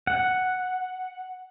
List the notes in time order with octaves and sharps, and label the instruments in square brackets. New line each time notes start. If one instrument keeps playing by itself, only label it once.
[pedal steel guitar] F#5